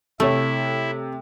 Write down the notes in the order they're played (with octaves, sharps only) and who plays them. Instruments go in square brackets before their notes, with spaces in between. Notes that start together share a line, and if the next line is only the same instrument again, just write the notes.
[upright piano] C3 [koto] A3 [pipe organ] E4 [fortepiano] A4 C#5